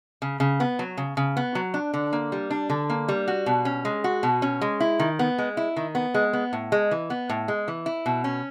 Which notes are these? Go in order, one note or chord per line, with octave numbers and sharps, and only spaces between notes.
C#3
C#3
B3
F#3
C#3
C#3
B3
F#3
D4
D3
A#3
G3
D4
D3
A#3
G3
F#4
B2
C#4
G#3
F#4
B2
C#4
G#3
E4
D#3
B3
G#3
E4
D#3
B3
G#3
B3
A2
G#3
E3
B3
A2
G#3
E3
E4
B2
C#4